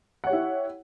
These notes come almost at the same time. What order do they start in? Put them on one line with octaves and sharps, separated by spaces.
F#5 C#5 G4 E4